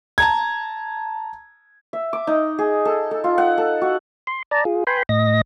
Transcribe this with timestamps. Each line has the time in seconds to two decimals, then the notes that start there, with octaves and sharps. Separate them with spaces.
0.18 A5 A#5 G#6
1.93 E5
2.13 D6
2.27 D#4
2.59 G#4
2.85 A4
3.11 A4
3.24 F4
3.38 F#5
3.58 A4
3.82 F#4
4.27 C6
4.51 D5 A5 A#5
4.65 F4 G#4
4.87 B4 G5 G#5 B5 C6
5.09 A2 D#5 A#6